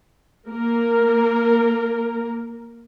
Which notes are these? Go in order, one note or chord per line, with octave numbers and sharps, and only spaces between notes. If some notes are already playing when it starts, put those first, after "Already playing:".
A#3 A#4